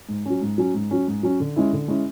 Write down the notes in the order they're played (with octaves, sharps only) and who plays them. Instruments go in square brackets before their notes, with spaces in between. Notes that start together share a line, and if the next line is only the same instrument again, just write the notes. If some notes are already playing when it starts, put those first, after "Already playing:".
[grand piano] G#2
F#3 C#4
G#2
F#3 C#4
G#2
F#3 C#4
G#2
F#3 C#4
D3
G#3 C#4 E4
D3
G#3 C#4 E4